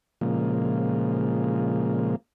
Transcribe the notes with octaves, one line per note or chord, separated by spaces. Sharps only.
A#2 C#3 F3 G#3 A#3